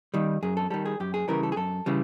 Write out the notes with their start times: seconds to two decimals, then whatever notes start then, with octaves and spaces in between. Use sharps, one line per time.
0.14 D#3 G3
0.43 F#2 G#4
0.57 A4
0.70 D#3 G3 A4
0.85 G#4
1.00 F#2 G4
1.14 G#4
1.28 C#3 E3 G3 A#4
1.43 A4
1.52 G#4
1.56 F#2 A4
1.86 C#3 E3 G3